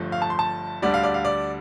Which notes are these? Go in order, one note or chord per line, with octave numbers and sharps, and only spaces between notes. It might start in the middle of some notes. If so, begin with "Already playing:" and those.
Already playing: G1 G2 F3 A3
F5
A5
C6
A5
D2 D3 G3 D5
F5
D5
F5
D5